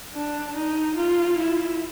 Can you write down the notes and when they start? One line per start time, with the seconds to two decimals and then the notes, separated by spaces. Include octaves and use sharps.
0.13 D4
0.55 D#4
0.97 F4
1.38 E4